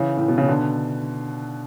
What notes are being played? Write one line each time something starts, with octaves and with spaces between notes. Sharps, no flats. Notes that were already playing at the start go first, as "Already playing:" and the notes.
Already playing: C#3 E3
A2
B2
C#3
B2 D3